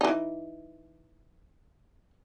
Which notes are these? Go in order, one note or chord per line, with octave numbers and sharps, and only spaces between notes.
E3 D#4